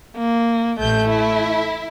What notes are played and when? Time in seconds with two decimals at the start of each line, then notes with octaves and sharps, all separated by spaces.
0.17 A#3
0.80 A1 A3 G6
1.09 E4